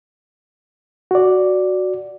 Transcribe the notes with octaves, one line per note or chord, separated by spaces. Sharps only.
F#4 D5